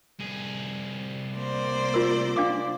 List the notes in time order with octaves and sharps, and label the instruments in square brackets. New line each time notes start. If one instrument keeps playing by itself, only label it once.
[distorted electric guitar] C2 G#4
[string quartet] A#3 C5 D5
[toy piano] F4 A#4
D4 F5 D6